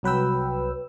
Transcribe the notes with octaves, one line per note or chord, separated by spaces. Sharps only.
C2 F#3 B4 G5 E6